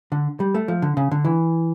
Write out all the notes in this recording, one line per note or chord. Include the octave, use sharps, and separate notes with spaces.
D3
G3
A3
F3
D3
C#3
D3
E3